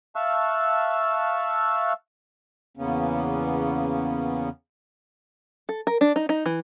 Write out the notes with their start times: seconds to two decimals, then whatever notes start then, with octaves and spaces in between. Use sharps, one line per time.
0.16 E5 F5 A5 C#6 E6 F#6
2.77 E2 C#3 A#3 B3 C#4
5.69 A4
5.87 A#4
6.01 D4
6.16 D#4
6.29 D#4
6.46 E3